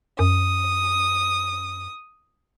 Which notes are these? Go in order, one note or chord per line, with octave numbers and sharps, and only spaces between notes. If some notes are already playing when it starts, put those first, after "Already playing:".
F#2 D#6